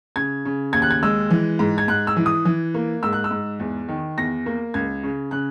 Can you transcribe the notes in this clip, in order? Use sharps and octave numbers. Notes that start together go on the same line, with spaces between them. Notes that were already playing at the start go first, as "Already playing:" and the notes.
C#3 G#6
C#3
D#2 G#6
F#6
G#6
G#3 E6
E3
G#2
G#6
G#2 F#6
E6
E3
D#6
E3
A#3
G#2 E6
F#6
E6
G#2
E2
D#3
E2 A#6
A#3
C#2 G#6
C#3
C#3 F#6